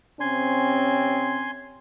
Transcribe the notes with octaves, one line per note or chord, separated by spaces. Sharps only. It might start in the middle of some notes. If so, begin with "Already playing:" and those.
C3 C4 C#4 G#5 C6